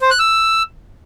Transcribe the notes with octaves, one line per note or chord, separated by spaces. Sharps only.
C5
F#6
E6